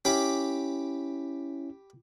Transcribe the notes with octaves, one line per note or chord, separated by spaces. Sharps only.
C#4 E4 G4 B5 D6